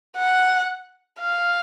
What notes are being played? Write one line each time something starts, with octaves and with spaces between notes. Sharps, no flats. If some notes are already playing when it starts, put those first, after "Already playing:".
F#5
F5